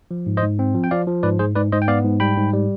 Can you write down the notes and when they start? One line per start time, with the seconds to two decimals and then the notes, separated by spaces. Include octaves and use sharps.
0.11 F3
0.26 G#2
0.37 C5 D#5
0.42 G#2
0.59 C4
0.74 F3
0.84 G5
0.91 F3 D5 F5
1.07 F3
1.23 G#2 B4 D5
1.39 G#2 G#4 C5
1.55 G#2 B4 D5
1.72 G#2 C5 D#5
1.82 G5
1.88 B3 D5 F5
2.04 G#2
2.20 G3 G5 B5
2.37 G#2
2.53 G3